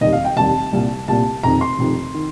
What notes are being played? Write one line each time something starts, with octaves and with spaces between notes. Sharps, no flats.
F1 D#2 D#3 G3 D#5
F5
G5
F1 D#2 D#3 G3 A5
C2 A#2 G3
C2 A#2 G3 A5
F1 F2 D#3 A#5
C6
F1 F2 D#3
D#3